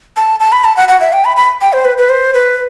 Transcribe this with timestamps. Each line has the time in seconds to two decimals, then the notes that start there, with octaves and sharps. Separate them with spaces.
0.17 A5
0.40 A5
0.52 B5
0.64 A5
0.77 F#5
0.88 F#5
1.00 E5
1.13 G5
1.25 B5
1.37 B5
1.61 G5
1.73 C5
1.85 B4
1.98 B4
2.09 C5
2.34 B4